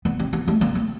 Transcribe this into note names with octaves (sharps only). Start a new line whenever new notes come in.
B3
C4
B3
A3
A#3
A3